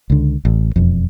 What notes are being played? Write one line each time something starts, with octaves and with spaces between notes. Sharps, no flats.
C#2 D3
A1
E1 F2